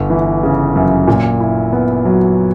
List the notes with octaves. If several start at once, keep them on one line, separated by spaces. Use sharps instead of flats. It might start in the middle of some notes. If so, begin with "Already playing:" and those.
Already playing: G1
E3
C#3
F#2
A#2
E4
B3
F#3